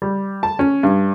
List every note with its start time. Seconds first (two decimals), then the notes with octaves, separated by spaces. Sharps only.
0.02 G3
0.43 A5
0.59 C#4
0.83 G2